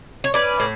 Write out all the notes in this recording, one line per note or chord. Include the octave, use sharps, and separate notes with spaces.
C#5
C#4 B4 D5
A2